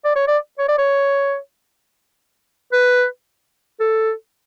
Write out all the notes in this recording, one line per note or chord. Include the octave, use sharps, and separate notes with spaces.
D5
C#5
D5
C#5
D5
C#5
B4
A4